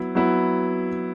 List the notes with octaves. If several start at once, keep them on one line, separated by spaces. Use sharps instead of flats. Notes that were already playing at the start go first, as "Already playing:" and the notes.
Already playing: F#3 B3 E4
F#3 B3 E4